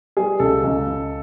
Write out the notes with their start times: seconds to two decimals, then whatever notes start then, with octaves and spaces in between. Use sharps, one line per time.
0.17 G3 G#4
0.40 C#2 A4
0.64 C#2
0.87 C#2